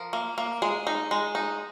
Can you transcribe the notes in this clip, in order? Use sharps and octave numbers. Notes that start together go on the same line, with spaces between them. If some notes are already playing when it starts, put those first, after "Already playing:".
Already playing: F3 A#4
A#3
A#3
G#3 G#4
D#4
G#3
D#4